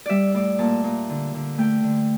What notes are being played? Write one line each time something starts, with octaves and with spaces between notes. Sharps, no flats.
G3 D5 E5
A2 D5
A#2 A5
A#2
D3
D3
A3 G5
D3